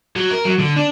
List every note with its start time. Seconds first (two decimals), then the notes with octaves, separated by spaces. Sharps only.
0.16 F#3
0.31 A#4
0.45 F#3
0.60 D3
0.77 D4